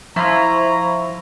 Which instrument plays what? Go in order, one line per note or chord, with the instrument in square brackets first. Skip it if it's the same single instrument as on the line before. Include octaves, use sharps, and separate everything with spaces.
[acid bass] F3 [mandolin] E4 F4 [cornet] A#5 [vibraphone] B5 C#6